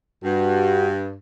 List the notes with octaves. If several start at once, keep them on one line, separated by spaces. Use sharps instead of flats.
G2 F#4